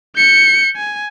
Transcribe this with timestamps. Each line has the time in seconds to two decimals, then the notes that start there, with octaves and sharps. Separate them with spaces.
0.16 G6 C#7
0.76 G#5